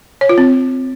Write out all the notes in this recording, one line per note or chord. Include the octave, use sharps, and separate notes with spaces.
C#5
F4
C4